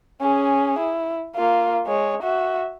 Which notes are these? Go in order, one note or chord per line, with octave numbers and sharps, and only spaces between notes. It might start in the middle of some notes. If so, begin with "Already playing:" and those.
C#4 G#4
E4
A#3 F4
G#3 C#5
F#4 E5